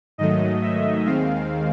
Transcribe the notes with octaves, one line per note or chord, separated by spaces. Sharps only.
G#2 D#3 F#3 A3 D#5
E5
D#2 D#3 G#3 C4 F5